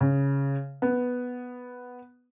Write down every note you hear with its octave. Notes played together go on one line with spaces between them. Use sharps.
C#3
B3